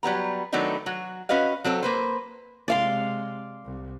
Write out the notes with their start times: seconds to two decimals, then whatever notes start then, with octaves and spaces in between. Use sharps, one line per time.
0.03 F#3 G3 B3 A#5
0.52 D#3 F#3 A3 B3 D4 D#4
0.86 F#3 F#4
1.29 C#4 F#4 B4 D#5 F5
1.64 F#3 C4 A4 C#5
1.83 A#3 B4 C5
2.68 C3 G#3 D5 F5 C6
3.65 C2